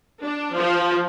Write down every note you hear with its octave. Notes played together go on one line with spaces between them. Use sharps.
D4
F3